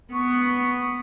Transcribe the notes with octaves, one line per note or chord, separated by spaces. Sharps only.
B3 C#6